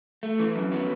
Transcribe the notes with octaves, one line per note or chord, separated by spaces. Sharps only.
A3
E3
F#2
B3